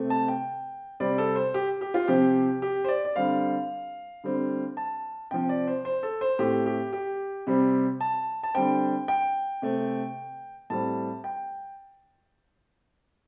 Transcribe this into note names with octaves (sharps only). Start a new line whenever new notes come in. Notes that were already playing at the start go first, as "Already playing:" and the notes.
Already playing: C3 A3 C4
A5
G5
C3 G3 C4 D5
A4
C5
G4
G4
F4
C3 F3 C4 G4
G4
C5
D5
D5
D3 G3 C4 F5
D3 G3 C4
A5
C3 F3 C4 G5
D5
C5
C5
A4
C5
A2 A3 C4 G4
G4
G4
C3 G3 C4
A5
A5
D3 G3 C4 G5
G5
C3 A3 C4
A2 G3 C4 A5
G5